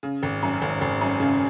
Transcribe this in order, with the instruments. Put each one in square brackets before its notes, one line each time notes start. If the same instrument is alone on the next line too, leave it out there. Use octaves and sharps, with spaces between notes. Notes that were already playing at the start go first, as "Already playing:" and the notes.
[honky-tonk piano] C#3
G#1
F#2
G#1
G#1
F#2
C#3